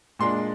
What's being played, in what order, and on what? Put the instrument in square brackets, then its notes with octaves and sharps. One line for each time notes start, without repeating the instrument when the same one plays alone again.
[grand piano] A#2 G#3 D4 C6